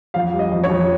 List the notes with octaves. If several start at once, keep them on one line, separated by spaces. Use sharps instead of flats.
F2 F5
G3
D#5
F2
C#5
F2